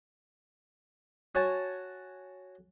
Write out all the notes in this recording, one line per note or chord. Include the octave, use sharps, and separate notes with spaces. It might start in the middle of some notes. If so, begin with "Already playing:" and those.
F#4 C#5 G#5 A5